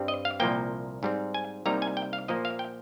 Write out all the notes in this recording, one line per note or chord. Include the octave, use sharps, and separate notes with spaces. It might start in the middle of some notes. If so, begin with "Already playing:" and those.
Already playing: G2 G3 C4
D#5
F5
C2 A#2 F3 A#3 G5
G#2 G3 C4
G#5
C2 C3 G3 A#3 D#4 A#5
G#5
G5
F5
A#2 F3 A#3 D#5
F5
G5